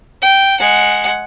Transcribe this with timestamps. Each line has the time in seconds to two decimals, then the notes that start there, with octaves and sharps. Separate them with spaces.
0.22 G5
0.60 G#3 F#5